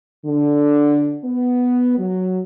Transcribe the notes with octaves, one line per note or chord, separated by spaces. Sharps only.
D3
B3
F#3